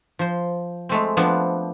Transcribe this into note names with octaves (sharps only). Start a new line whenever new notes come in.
F3 C5
G#3 A3 C4
F3 B3 C4 D4 F#5